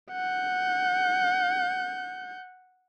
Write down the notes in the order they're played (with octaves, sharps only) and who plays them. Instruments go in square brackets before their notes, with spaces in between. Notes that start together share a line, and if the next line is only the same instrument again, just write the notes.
[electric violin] F#5 G6